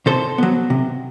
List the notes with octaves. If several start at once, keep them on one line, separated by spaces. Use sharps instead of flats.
C3 A4 C5
F#3 B3
C3